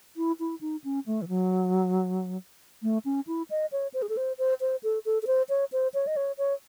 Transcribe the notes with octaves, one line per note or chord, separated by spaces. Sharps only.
E4
E4
D#4
C#4
A3
E3
F#3
A3
C#4
E4
D#5
C#5
C5
G#4
A4
C5
C5
C5
A4
A4
A4
C5
C#5
C5
C#5
D#5
C#5
C#5